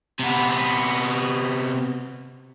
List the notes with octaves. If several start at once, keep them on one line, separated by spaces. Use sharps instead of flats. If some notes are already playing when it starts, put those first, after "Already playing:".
C3 B3